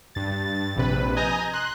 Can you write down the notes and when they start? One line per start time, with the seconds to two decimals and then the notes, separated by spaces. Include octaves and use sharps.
0.15 G2 A6
0.76 A#1 C3 B4
1.16 D#5 G#5 A#5 D#6 G6 A#6
1.53 C6 F#6